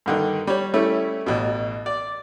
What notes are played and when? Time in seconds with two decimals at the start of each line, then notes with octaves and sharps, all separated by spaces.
0.06 G2 D3 D#3
0.47 G3 C#5
0.74 G3 A3 C#4 E4
1.26 A1 B2
1.86 D5